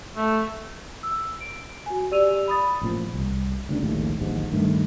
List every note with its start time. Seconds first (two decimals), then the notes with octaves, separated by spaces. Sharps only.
0.16 A3
1.03 E6
1.41 D7
1.86 F#4 G#5
2.11 G4 D5 E6 D#7 F7
2.48 B5 D#6 A6
2.81 A1 A#2 F3
3.14 C2
3.69 D2 C#3 A3 D4
3.83 A#1 D#2 A2 G#3
4.19 D1 A#1 D#2 G#2
4.53 G2 D#3 A3